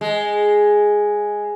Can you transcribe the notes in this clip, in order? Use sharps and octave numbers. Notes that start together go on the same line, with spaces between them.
G#3